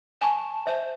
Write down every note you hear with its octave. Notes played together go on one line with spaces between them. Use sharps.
G#5 A5 C#6
C5 E5